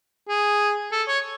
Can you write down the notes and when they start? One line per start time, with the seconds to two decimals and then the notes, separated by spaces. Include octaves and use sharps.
0.29 G#4
0.92 A4
1.08 C#5